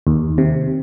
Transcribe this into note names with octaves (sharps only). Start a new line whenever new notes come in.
D#2
C3